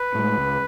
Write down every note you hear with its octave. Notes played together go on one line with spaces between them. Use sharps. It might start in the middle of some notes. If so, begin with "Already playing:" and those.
Already playing: B4
A2 G#3
C#2